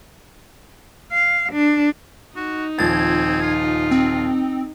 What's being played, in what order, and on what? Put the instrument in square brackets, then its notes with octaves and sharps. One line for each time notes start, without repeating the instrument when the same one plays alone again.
[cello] F5
D4
[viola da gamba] D#4 [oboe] F#4
[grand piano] D#1 F3 A6 [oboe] C4 [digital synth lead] G#6
[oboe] F4
[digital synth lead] C4